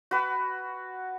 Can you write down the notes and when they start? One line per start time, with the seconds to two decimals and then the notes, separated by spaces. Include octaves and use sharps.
0.11 F#4 B4